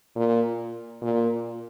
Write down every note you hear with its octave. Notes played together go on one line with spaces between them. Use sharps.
A#2
A#2